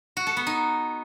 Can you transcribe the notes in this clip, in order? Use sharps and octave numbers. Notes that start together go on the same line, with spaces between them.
F#4
A4
B3
D#4